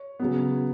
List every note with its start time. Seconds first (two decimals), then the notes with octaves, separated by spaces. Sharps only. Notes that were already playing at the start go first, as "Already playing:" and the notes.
Already playing: C#5
0.20 C#3 F#3 B3